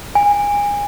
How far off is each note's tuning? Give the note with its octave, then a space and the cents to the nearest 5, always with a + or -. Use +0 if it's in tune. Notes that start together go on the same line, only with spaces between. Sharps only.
G#5 -25